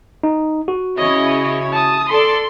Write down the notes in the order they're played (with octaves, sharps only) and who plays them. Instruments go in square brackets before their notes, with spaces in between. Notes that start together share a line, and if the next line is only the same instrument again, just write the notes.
[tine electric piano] D#4
F#4
[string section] C#3 E4 C#5 [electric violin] D#5
[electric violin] A5 D#6
[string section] A4 D5 [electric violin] C6